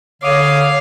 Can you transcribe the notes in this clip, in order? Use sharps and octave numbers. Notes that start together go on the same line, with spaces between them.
D3 C#5 F5 D6 D#6